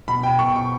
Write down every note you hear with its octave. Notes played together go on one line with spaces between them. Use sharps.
B2 B5
G5
B2 C#6
C#6